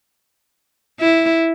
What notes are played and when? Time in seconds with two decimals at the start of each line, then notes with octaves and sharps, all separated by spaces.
1.00 E4